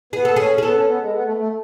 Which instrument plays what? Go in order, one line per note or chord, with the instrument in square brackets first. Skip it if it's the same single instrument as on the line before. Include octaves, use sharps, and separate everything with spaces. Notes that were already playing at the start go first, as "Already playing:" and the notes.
[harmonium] B3 [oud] G#4
[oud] A4
[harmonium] C#4 [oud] G#4
[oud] G#4
[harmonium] B3 [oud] A4
[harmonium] C#4
B3
G#3
B3
A3
A3